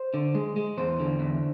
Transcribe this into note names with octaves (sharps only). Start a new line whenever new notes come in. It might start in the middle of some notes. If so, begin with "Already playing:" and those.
Already playing: C5
D3
G#3
G#3
E2 C5
D3
E2